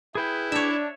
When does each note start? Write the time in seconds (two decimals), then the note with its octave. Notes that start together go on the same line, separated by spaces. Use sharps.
0.15 E4 G#4 B4 G5
0.52 D4 C#5 E5